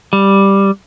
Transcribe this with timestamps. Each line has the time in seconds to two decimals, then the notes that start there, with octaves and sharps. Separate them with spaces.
0.13 G3